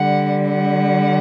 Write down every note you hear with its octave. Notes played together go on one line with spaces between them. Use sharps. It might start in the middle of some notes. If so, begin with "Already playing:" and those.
Already playing: D3 G3 F#5
F#5